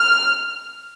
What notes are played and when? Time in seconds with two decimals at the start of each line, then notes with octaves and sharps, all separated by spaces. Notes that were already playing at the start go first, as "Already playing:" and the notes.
Already playing: F6